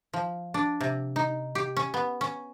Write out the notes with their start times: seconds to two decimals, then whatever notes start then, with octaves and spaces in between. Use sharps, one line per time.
0.13 F3
0.54 D4
0.81 C3
1.16 D#4
1.55 G4
1.77 C#4
1.94 B3
2.21 C#4